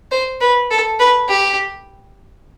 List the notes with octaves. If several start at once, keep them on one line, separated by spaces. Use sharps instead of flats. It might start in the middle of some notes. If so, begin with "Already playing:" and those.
C5
B4
A4
B4
G4